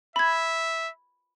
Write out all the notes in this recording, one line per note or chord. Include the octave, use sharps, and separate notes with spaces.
E5 B5 G#6